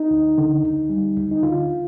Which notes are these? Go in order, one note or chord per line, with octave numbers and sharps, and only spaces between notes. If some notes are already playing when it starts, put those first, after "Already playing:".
Already playing: D#4
D2
D3
D2
G3
D2
D#4
D3 F4